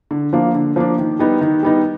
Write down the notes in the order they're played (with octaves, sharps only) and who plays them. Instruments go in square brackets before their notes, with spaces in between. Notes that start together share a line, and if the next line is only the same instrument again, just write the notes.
[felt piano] D3
F3 A#3 D4
D3
F3 A#3 D4
D#3
G3 B3 D#4
D#3
G3 B3 D#4